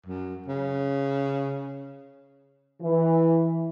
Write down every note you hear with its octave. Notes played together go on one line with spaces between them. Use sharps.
F#2
C#3
E3